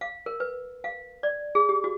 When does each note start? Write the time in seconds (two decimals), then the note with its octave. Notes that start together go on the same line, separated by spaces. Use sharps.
0.01 F5
0.26 A#4
0.40 B4
0.84 F5
1.23 D5
1.55 G#4
1.69 G4
1.84 F#4